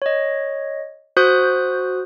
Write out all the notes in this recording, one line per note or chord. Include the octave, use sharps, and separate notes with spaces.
C#5 D#5
F#4 C5 D#6 F#6 G6